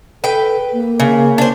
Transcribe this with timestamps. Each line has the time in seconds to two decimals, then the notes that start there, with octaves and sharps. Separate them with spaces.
0.24 A4 B4 G5
0.73 A#3
1.00 C#3
1.38 D4 C5